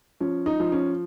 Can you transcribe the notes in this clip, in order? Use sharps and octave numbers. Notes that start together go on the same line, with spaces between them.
F3 C#4
D#4
F3
C#4